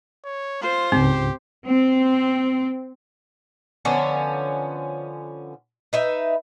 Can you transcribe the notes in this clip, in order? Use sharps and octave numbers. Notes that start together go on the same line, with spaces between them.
C#5
F4 C5
C#2 G#2 C4 G4
C4
D3 F3 B3 C#4
D#4 B4 E5